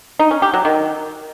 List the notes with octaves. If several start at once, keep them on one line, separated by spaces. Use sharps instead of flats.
D#4
C#4
G4
F#3
D#3